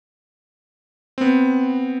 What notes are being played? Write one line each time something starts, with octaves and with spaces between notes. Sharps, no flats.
B3 C4